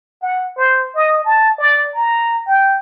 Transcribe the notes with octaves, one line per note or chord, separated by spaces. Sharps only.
F#5
C5
D#5
A5
D5
A#5
G5